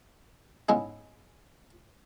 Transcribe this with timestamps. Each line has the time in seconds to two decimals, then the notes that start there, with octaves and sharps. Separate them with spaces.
0.69 G#2 C#3 G#3 B3 E4